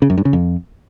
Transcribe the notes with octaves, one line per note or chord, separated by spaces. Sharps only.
C#3
F#2
G2
C#3
F2